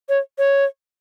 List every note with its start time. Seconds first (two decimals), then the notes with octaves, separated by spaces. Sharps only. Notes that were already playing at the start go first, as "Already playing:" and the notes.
0.09 C#5
0.38 C#5